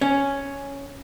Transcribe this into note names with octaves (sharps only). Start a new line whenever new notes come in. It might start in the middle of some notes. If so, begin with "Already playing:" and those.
C#4